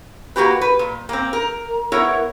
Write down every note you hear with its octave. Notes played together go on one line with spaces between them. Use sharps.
A#3 B3 F#4 G4 B4
B4
A#2
A#3 C4
A#4
B3 E4 A#4 C#5